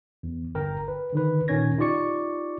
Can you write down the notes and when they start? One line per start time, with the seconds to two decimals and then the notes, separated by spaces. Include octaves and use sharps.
0.23 E2
0.55 G1 A#4 G5 A#5
0.88 B4
1.13 D3 D#3 B4
1.48 A#2 D#3 C#4 C#5 G#6 A#6
1.78 D#4 F4 G4 D5 C#6 C#7